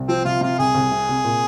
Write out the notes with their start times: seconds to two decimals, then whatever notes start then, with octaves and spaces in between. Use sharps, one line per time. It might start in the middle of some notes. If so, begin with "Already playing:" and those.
Already playing: C2
0.08 F3 C4
0.25 C3 F4
0.41 C3 F4
0.59 C2 G#4
0.75 C2
0.91 C3
1.09 C3
1.24 A#2